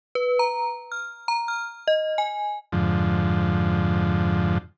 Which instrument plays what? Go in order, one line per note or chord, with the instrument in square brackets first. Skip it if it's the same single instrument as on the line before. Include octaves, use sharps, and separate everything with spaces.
[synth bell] B4
A#5
F6
A#5
F6
D#5
G#5
[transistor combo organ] F2 G#2 D3 F3